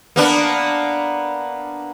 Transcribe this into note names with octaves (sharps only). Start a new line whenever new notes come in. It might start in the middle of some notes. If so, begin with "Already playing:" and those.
A#3 B3 D4